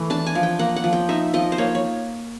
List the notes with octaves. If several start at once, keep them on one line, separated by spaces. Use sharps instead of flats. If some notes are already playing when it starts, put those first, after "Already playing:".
Already playing: E3 A3
D4 A5
G#5
F3
G5
A#3 F#5
F#5
F3
G5
D#4 E5
F3 D#5
C5
A#3 C#5
C#5